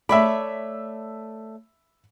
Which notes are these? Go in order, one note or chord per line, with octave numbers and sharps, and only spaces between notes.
A3 C#5 D5 E5 B5